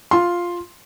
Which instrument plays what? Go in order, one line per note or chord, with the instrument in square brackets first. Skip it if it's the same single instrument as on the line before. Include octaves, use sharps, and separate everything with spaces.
[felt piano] F4 C6